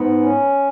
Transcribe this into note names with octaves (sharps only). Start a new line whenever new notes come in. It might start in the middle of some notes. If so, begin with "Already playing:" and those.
Already playing: G#2 B3
C#4